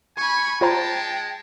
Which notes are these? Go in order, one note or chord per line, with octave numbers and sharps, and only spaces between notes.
G#5 B5 C#6
G#3 F4 C5 G5 A5 A#5